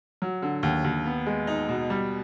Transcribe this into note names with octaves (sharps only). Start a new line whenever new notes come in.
F#3
D3
D#2
D#2
B3
G#3
D#4
B2
G3